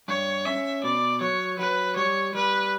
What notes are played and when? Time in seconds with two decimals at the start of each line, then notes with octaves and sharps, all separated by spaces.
0.08 G2 C#5
0.45 C#4 E5
0.84 B2 D5
1.21 F#3 C#5
1.59 F#3 B4
1.96 G3 C#5
2.34 G3 B4